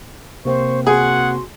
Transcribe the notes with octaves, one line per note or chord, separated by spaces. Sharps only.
C3 A#3 C4 C5 C#6
F#4 G#4 F#5 C6